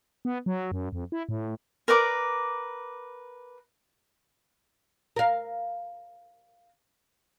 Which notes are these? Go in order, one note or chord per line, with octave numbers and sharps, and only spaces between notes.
B3
F#3
F#2
F2
E4
A2
A#4 B4 D5 D6
A#4 F5